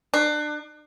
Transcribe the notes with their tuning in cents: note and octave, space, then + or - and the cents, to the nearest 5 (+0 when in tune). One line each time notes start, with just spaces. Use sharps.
D4 +30